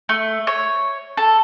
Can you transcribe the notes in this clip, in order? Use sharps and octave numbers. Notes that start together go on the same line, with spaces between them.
A3
C#5
A4